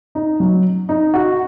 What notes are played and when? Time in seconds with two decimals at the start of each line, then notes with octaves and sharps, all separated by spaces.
0.15 D#4
0.40 F#3
0.89 D#4
1.14 F#4